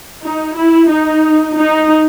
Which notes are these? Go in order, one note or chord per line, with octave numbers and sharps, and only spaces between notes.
D#4
E4
D#4
D#4